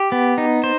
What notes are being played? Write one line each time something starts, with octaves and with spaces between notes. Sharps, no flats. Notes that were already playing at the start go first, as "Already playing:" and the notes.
Already playing: G4
B3
D#4
C5